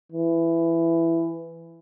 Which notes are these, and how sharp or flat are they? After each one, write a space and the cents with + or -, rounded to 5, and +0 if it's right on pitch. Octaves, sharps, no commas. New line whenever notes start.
E3 +10